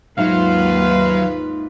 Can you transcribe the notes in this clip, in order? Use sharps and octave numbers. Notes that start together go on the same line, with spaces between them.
D#2 G#2 F#3 F4 B4 E5 F5